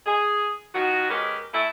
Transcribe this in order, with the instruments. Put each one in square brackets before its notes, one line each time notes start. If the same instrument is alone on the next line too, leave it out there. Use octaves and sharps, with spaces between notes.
[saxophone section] G#4
D#3 F3 F#4
G#3 C#4 G4 A#4 B4
A3 E4